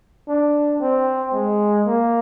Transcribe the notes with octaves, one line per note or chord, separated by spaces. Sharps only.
D4
C4
G#3
A#3